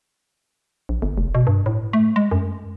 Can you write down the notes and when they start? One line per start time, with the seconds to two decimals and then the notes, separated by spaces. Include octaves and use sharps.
0.89 A#1
1.02 G1
1.18 F1
1.35 B2
1.47 G2
1.66 A2
1.93 A3
2.16 G#3
2.31 F#2